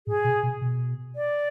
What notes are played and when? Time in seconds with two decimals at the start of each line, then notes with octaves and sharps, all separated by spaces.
0.07 A2 G#4
0.24 B2
0.43 B2
0.61 B2
1.16 D5